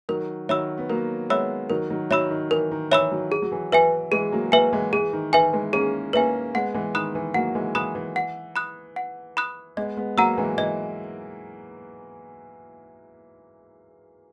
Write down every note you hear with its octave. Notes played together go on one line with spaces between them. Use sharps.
D#3 F#3 A#4
D#3 F#3 C#5 E5 B5 E6
B3
F#3 A#3 A#4
G#3 B3 C#5 E5 B5 E6
D#3 F#3 A#4
D#3 F#3
D#3 F#3 C#5 E5 B5 E6
D#3
E3 A#4
D#3
E3 C#5 E5 B5 E6
D#3 F#3
G#4
F#3
E3
E3 B4 E5 G#5
E3 G#3 G#4
F#3 A#3
F#3 A#3 B4 E5 G#5
E3 G#3
E3 G#4
D#3
E3 B4 E5 G#5
E3 G#3
A#3 C#4 G#4
A#3 C#4 B4 E5 G#5
G#3 B3 F#5
E3 G#3
D#3 B5 D#6 F#6
E3
F#3 A#3 F#5
E3 G#3
E3 B5 D#6 F#6
E3
F#5
B5 D#6 F#6
F#5
B5 D#6 F#6
G#3 B3 D#5
G#3 B3
F#3 A#3 F#5 A#5 E6
E3 G#3
E3 D#5